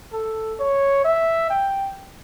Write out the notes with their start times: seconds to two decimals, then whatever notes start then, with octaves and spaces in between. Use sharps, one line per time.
0.13 A4
0.59 C#5
1.05 E5
1.50 G5